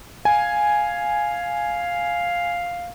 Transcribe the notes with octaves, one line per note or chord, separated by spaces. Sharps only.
F5 G#5